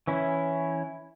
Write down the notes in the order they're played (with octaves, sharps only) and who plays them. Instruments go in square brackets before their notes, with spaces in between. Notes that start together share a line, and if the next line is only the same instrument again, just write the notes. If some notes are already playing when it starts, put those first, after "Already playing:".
[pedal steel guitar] E3 C#4 E4